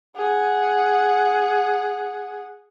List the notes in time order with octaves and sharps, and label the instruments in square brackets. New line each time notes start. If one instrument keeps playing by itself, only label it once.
[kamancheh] G#4 F#5